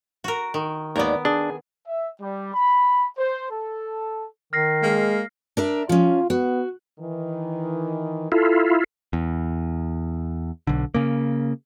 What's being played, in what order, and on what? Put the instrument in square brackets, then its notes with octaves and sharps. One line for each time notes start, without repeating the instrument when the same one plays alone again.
[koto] F#4 A#4
D#3
[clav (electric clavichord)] D#2 [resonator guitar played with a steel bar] G#3 D5 [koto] B3 A#4
[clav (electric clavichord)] D4 [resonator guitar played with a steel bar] G#4
[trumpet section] E5
G3
B5
C5
A4
[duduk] D#3 [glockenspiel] F6 A#6 C7
[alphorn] G#3 [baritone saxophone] A#3
[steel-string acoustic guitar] D4 A#4 E5
[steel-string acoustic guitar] F3 C#4 [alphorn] F4
[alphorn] B3 [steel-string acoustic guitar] F#4
[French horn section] D#3 E3
[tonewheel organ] E4 F4 [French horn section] A4
[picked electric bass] E2
B1 D3
C#3 A#3